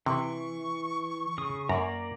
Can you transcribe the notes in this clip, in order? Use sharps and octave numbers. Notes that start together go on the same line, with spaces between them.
C3 E3 C#6
C#3 D#6
F#2 A#3 D5 A#5